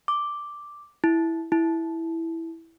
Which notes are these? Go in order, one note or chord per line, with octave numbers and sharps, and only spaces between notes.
D6
E4
E4